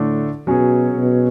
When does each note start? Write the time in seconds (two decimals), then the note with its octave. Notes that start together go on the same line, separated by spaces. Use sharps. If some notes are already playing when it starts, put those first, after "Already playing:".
Already playing: A2 D3 A3 D4
0.47 B2 F#3 C#4 G#4
0.96 B2